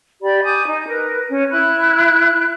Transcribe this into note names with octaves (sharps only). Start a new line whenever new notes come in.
G4 D5 B5
G#5 D6 D#6 G6
D#4
A#4 B4
C#4 C#5
E4 B5 F#6